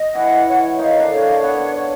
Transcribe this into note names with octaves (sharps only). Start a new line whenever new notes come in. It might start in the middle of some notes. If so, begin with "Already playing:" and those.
Already playing: D#5
E3 E4 F#5
C#5
D#3 D#4 F5
D3 D4
C#5
B3 F#5
C#5